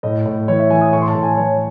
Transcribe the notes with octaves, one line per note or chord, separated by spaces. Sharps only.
A2 D#5
A2
E3 C#5
E5
E3 G#5
D#6
A2 C#6
C6
A5
A2
G#5
E3 C#5